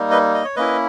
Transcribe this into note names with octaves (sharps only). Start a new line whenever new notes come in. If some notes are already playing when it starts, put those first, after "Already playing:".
Already playing: G3 A#3 D#4
B4 D#5
D#5
C#5
A#3 C#4 E4 B4 D#5